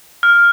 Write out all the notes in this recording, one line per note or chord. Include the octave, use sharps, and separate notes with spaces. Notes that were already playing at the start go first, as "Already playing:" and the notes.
F6